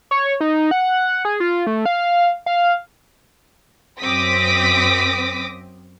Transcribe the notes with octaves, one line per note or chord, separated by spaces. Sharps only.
C#5
D#4
F#5
G#4
F4
A3
F5
F5
F#2 C4 D6 D#6 A#6 B6